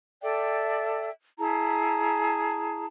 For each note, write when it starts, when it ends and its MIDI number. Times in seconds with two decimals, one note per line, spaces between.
0.22 1.10 69
0.22 1.10 74
0.22 1.10 76
0.22 1.10 79
1.39 2.86 64
1.39 2.86 68
1.39 2.86 81
1.39 2.86 82